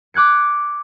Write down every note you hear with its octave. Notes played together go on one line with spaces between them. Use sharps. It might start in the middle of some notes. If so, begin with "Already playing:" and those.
D6 F#6 G#6 C#7